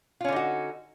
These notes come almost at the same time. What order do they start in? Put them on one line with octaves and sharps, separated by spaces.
F4 C#4 D3 D#4 F#4